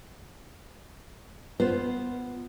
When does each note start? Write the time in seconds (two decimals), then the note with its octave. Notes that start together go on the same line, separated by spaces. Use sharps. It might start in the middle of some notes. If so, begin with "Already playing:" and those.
1.60 B3 F4 C5